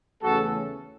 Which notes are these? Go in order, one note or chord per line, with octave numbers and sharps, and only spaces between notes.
E2 C#3 E3 A3 C#4 F#4 A4